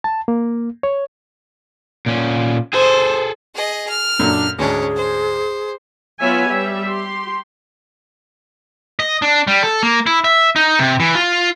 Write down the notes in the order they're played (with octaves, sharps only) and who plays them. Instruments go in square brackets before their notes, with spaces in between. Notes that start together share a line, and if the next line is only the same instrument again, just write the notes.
[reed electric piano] A5
A#3
C#5
[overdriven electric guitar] A#2 C#4
[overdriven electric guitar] G#4 A4 [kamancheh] C5
[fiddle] G#4 D#5
F6
[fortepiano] F#2 A#2 A4 [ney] D4
[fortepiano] D2 G#2 [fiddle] C#4 D4 [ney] G#4
[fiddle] C5
[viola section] F#3 B3 F4 C#5 E5 G#5
G3 G4 E5
G4 C6
[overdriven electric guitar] D#5
D4
G3
A4
A#3
E4
E5
D#4
C3
E3
F4